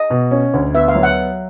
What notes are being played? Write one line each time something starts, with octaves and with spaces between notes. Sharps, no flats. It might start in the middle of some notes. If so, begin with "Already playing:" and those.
Already playing: D#5
B2
C#4
D2
B3 E5
F5
F#3
F#5